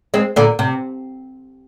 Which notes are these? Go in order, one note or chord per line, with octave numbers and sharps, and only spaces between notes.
G#3 C4
A#2 D3
C3